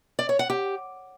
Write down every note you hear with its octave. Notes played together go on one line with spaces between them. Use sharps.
D5
C#5
F#5
G4